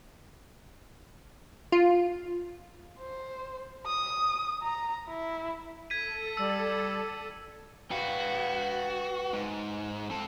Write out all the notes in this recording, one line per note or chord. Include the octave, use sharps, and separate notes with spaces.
F4
C5
D#6
A#5
E4
A4 G#6 B6 D#7
G3 E6
F#4 B4 F5 G5
G#2
C4 A4